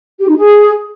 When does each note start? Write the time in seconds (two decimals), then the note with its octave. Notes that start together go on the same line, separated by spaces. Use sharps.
0.20 G4
0.28 D#4
0.36 G#4